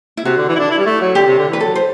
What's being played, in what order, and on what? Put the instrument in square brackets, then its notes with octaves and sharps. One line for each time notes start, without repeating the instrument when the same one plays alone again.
[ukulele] E4
[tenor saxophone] C3 [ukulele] F#4
[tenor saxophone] D3
E3
E4
D4
E4
G3
A3
F#3
[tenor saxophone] D3 [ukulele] G4
[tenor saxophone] C3
D3
E3
[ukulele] B4
[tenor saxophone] F#3 [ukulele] A4
[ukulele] C5